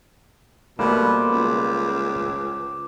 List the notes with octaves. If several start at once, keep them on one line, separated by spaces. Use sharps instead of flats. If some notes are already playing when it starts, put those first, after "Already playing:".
B2 G3 A3 A#3 B4 C5 D6
C#2